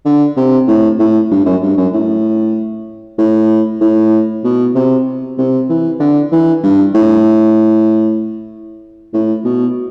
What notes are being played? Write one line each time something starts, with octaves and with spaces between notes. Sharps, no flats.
D3
C3
A2
A2
G2
F#2
G2
F#2
A2
A2
A2
B2
C3
C3
E3
D3
E3
G2
A2
A2
B2